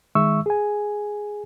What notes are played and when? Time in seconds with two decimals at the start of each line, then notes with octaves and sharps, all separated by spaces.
0.15 D#3 G#3 E5 C#6 E6
0.46 G#4 G#5